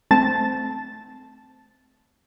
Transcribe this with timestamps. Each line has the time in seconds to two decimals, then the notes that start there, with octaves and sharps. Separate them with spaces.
0.11 A3 C4 A5 A6